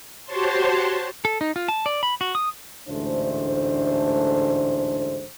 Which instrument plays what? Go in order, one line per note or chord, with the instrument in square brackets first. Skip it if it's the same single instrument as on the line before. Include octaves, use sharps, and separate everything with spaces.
[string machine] F#4 G4 C5 C#5 A5 C6
[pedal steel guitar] A4
D#4
F4
A5
D5
B5
F#4
D#6
[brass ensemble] A1 D2 G#2 A3 D4 C5